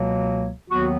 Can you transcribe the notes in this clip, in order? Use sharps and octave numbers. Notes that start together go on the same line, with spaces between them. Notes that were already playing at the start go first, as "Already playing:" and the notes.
Already playing: C#2 B2 F#3 A#3
D#2 D#3 F#3 B3 F#4